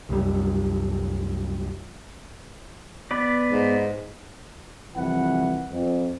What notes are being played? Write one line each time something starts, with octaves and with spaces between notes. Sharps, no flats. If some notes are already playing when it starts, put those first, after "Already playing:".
C2 F#2 G3
B3 B4 D5
G#2
C2 F2 E3 B4 F#5
F2